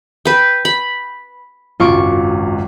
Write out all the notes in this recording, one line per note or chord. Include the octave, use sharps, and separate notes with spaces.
B4 G5
B5
G#1 C#2 F#2 F4 C#6 D6